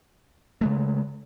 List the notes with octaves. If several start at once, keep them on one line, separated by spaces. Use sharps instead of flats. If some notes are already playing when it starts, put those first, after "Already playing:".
C#3 G#3 A3